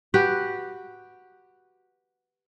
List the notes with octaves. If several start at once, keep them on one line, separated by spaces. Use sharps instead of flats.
F#4 G4 B4